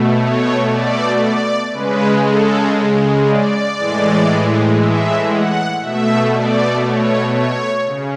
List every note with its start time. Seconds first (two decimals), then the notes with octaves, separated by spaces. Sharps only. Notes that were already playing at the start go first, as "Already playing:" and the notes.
Already playing: B2 A3
0.18 C#5
0.69 D5
1.21 D5
1.71 C#3 G#3 B4
2.22 A4
3.26 D5
3.76 A2 E3 G#3
4.79 E5
5.30 F#5
5.81 B2 A3 E5
6.32 D5
6.84 C#5
7.35 C#5
7.86 C#3